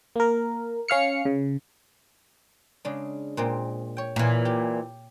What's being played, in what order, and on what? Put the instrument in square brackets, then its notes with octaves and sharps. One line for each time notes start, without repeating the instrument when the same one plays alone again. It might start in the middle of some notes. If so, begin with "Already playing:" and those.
[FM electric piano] A#3 A#4
C#4 F5 F6 C#7
C#3
[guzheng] C#3 G#3 D4
A#2 G#3 C4
C#5 G5
[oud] A#2 E3
[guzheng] G4